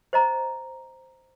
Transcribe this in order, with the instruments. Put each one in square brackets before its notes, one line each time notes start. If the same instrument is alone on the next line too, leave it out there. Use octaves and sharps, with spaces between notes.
[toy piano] C5 D#5 A#5